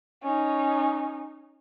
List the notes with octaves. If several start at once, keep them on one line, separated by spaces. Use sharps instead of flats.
C#4 D#4